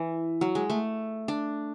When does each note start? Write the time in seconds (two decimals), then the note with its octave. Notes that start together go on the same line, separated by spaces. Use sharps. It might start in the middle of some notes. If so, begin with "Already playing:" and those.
Already playing: E3
0.41 F#3
0.55 G#3
0.70 A3
1.28 D4